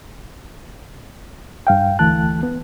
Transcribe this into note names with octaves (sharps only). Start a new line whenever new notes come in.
G2 F5 G5
D2 E3 A3 A5 F#6
B3